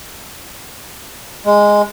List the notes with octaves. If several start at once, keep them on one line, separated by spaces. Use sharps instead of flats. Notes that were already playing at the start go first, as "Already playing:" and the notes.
G#3